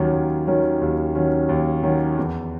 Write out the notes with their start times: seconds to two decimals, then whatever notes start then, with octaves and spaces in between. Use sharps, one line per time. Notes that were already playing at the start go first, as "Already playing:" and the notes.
Already playing: D#2 D#3 F#3 C#4
0.12 D#2
0.47 D#3 F#3 C#4
0.81 D#2
1.15 D#3 F#3 C#4
1.49 D#2
1.83 D#3 F#3 C#4
2.17 E2